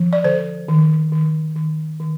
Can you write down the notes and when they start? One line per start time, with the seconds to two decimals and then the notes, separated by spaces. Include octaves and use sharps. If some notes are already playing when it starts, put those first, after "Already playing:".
Already playing: F3
0.13 D5
0.24 D3 C5
0.68 D#3
1.12 D#3
1.55 D#3
2.00 D#3